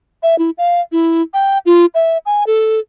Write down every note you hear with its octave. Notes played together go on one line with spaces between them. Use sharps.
E5
E4
F5
E4
G5
F4
E5
G#5
A4